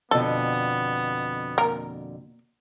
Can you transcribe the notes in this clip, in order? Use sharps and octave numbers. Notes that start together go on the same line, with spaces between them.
F2 B2 D3 B3 A4
A#3 A#4